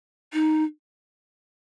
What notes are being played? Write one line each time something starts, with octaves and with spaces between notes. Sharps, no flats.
D#4